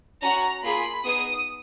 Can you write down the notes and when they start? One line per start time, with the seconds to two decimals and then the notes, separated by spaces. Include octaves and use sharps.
0.22 C#4 F#4 A#5
0.64 A#3 F4 G#4 B5
1.05 B3 D#4 G#4 D#6